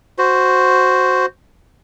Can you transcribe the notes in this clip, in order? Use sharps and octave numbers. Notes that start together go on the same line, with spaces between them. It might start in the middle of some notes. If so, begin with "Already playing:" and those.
F#4 C5